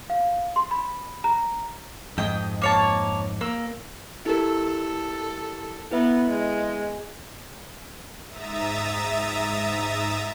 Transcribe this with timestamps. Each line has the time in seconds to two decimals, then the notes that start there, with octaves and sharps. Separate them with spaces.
0.10 F5
0.56 C6
0.71 B5
1.24 A#5
2.18 F2 G#2 D#5 G5
2.62 A#3 C#5 A5
3.41 A#3 E6
4.26 E4 G4 A4 A#4
5.92 B3 E4 B4 E5
6.30 G#3
8.29 G#2 E5 A#5 D#6 A6